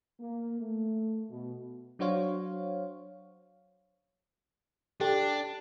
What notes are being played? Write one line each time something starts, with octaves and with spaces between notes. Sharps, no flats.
A#3
A3
B2
F#3 D4 F#4 C5 C#5 F5
D4 G4 A4 G5